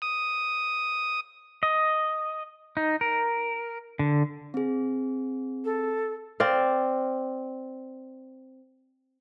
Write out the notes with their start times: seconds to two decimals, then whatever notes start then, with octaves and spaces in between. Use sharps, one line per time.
0.02 D#6
1.63 D#5
2.77 D#4
3.01 A#4
3.99 D3
4.54 C4 G#4
5.64 A4
6.40 C4 D5 F5